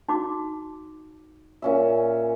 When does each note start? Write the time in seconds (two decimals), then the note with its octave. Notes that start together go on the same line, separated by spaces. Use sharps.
0.09 D#4 F#4 D6
1.62 A#2 C#4 E5